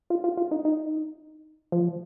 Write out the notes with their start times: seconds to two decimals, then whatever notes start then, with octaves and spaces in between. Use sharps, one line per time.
0.10 F4
0.24 F4
0.37 F4
0.51 D#4
0.65 D#4
1.72 F3